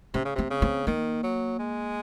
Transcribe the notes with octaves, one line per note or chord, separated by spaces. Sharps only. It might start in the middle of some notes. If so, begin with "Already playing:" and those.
C3 C#4
C#3
C3 C4
C#3
C4
D#3 A#3
F#3
G#3